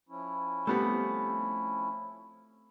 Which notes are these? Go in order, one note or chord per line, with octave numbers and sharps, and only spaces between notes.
F3 C#4 E4
G3 A3 B3 C4